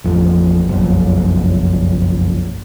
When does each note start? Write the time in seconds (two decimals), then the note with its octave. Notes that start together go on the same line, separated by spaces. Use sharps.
0.04 A1 F2
0.69 F#1 B1 F2